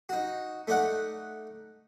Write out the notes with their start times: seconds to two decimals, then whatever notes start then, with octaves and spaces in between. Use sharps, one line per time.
0.09 D#4 F#4
0.67 A3 D#4 D5 F#5